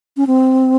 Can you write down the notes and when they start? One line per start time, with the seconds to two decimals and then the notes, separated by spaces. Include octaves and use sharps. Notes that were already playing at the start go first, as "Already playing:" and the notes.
0.17 C#4
0.27 C4